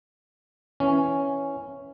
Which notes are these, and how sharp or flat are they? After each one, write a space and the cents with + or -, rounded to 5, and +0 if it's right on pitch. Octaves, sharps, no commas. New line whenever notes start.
E3 +0 C#4 +0